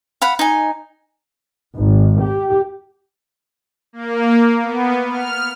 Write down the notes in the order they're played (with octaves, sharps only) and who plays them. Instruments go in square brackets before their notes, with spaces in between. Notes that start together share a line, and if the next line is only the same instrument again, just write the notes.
[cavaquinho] F5 F#5 B5
D#4 G#5
[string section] G#1
G4
[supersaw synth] A#3
B3
F6